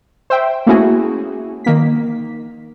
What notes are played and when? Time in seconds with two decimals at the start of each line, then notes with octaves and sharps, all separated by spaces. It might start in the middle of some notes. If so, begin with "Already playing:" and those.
0.30 C5 E5 G5
0.67 A3 A#3 C#4 E4 F#4 G#4
1.64 D#3 A#3 B6